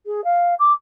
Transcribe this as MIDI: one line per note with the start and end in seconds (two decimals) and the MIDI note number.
0.06 0.24 68
0.24 0.55 77
0.59 0.73 86